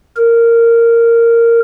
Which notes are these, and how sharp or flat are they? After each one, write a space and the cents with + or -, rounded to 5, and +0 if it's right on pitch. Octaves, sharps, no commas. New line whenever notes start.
A#4 -10